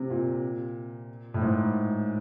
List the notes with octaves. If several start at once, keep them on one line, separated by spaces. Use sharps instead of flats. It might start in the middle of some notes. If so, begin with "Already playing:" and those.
Already playing: C3
A#2
A2
G#2